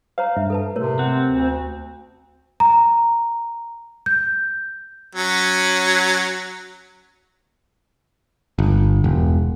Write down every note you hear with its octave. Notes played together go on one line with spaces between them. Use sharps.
C5 C#5 F5 A#5
G2 E5
A4 B4 A5
A2 C3 A#4 C#5
C4 F#5
D2
A#5
G6
F#3 C#4
G1
E1